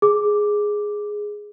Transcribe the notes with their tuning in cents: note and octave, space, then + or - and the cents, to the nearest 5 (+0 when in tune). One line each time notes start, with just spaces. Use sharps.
G#4 +0 D6 +0